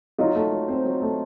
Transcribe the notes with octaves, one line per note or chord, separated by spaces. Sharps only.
F#3 D#4 F4
A3
F#3
C4
F#3
A3